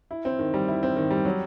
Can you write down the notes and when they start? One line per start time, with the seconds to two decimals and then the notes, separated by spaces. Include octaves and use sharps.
0.11 E4
0.25 C4
0.39 D#3
0.54 G3
0.68 E4
0.83 C4
0.97 D#3
1.10 G3
1.25 F#3